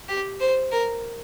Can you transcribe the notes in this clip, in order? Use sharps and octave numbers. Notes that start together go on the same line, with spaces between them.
G4
C5
A#4